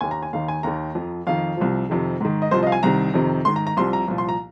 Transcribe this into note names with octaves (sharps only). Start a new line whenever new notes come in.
D#2 D#3 G#5
A#5
G#5
D#2 D#3 F5
G#5
D#2 D#3 A#5
F2 F3
F2 D#3 F5
C2 C3 F3
F2 C3 D#3
G#2 D#3
D#5
C2 C3 F3 C5
D#5
F5
G#5
C2 C3 D#3 A#5
F2 C3 D#3
G#2 D#3 C6
A#5
A#5
C2 C3 F3 C6
A#5
C2 A#2 F3
C6
A#5